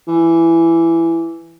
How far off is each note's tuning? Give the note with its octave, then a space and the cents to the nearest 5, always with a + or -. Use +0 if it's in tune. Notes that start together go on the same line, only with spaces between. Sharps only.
E3 +10